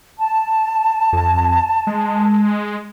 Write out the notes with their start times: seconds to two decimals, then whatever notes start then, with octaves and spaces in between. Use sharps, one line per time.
0.19 A5
1.13 F2
1.87 G#3